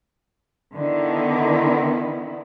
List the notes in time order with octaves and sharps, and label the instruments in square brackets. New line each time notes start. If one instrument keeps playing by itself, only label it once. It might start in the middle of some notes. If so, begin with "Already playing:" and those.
[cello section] D3 D#3 B3 E4